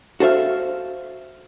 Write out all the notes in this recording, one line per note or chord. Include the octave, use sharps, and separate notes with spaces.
F#4 A4 C5 E5 F5